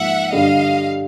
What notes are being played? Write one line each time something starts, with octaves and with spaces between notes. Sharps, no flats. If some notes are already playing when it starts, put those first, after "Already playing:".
Already playing: G#2 F3 A#3 E5 F#5
G2 D3 G3 D#5 F5